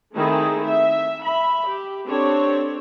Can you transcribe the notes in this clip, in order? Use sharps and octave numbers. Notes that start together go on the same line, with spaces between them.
D#3 A3 C4 D#4 E4 G#4
E5
E5 B5
G4
C4 D4 G4 A4 C#5